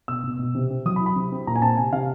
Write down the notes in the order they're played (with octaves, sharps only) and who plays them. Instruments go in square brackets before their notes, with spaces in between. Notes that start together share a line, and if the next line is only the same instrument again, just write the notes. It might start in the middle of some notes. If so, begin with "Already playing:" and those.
[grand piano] B2 E6
B2
B2
C3
C4
F#3 D#6
B5
E4
B5
C3
C4
A#2 A#5
G#5
C4 A5
C3 G#5
C3 F5